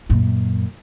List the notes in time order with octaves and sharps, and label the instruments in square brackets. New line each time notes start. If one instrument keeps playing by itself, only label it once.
[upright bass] F#2 A#2